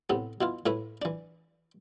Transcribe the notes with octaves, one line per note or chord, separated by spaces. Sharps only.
A2 C3 B3
B2 E4 F4
A2 A3 E4 B4
E3 D4